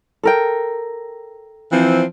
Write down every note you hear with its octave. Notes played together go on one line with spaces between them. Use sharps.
A4 A#4 G5
E3 F3 C4